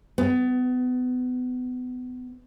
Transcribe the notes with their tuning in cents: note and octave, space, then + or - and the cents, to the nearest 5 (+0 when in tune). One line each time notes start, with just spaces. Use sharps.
B3 +30